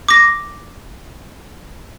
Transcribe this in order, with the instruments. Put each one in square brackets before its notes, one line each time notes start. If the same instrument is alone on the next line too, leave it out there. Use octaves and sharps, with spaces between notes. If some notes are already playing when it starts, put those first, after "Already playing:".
[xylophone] D6 A#6